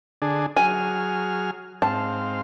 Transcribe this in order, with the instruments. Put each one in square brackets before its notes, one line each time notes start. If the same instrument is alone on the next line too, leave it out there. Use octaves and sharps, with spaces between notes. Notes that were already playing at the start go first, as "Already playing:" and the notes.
[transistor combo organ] D3 D4 G#4
[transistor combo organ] F#3 G#4 F6 [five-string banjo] G#5
[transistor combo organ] G#2 C4 F5 [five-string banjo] A5